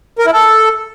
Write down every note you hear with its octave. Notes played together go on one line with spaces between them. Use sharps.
A#4
E4
A4